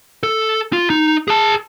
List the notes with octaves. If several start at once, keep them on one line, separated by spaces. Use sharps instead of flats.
A4
F4
D#4
G#4 A5